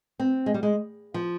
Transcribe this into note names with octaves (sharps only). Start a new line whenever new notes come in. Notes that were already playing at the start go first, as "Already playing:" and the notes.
C4
G#3
G3
G#3
F3